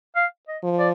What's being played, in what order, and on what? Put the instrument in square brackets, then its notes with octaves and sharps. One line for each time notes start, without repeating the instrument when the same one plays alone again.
[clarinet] F5
D#5
[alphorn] F3
[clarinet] D5